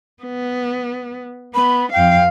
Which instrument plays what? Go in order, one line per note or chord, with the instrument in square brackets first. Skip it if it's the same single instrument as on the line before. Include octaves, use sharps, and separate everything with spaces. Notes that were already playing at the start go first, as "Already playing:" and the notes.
[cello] B3
[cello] B3 [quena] B5
[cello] F2 F5 [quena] G5